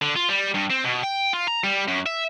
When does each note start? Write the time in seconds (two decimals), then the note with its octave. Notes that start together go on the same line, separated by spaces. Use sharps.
0.02 D3
0.16 F4
0.29 G3
0.54 G2
0.70 C4
0.84 B2
1.03 G5
1.33 F4
1.48 A#5
1.64 G3
1.88 F#2
2.06 E5